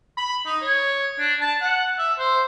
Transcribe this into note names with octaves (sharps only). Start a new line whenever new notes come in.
B5
D#4
C#5
D4
A5
F#5
E5
C5